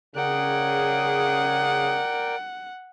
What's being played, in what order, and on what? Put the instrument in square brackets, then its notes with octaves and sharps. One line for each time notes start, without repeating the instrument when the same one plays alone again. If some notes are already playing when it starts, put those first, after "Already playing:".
[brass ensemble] C#3 G#4 [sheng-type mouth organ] A#4 D5 G5 [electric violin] F#5